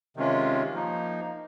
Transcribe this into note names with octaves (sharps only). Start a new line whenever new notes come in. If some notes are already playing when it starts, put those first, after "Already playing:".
C3 D#3 G#3 C#4 F4
F3 A#3 D#4